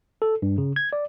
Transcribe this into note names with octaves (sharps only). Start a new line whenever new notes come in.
A4
G2
C#3
G#6
D5